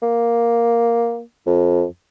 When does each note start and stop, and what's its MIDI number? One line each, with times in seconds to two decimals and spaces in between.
0.02 1.21 58
1.46 1.84 41